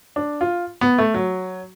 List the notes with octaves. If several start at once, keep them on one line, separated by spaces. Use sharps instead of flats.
D4
F4
B3
A3
F#3